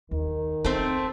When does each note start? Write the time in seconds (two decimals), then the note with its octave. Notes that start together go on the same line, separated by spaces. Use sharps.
0.11 D#2 D#3
0.65 A3 C4 D#4